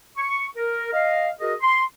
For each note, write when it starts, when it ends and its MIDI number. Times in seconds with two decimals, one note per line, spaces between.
0.17 0.45 85
0.57 0.91 70
0.93 1.29 75
0.93 1.29 77
1.40 1.54 66
1.40 1.54 68
1.40 1.54 70
1.40 1.54 75
1.61 1.83 84